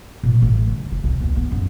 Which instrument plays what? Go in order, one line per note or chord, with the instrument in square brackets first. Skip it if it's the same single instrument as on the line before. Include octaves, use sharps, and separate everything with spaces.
[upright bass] A#2
A1
C#3
A3
C2
E2
B3
F#2